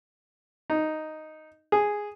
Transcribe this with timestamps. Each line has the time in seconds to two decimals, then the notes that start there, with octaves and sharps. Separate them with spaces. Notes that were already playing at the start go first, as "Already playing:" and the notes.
0.70 D#4
1.72 G#4